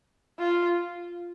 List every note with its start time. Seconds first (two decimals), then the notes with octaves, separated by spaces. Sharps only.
0.39 F4